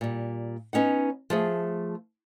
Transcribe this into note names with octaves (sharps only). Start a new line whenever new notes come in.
A#2 G3
B3 C#4 D#4 F#5
F3 A3 G#4